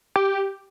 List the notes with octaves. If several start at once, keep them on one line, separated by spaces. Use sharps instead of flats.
G4